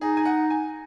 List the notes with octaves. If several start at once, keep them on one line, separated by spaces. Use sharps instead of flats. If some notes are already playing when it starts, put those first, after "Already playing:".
D#4 G#4
G#5
F#5
G#5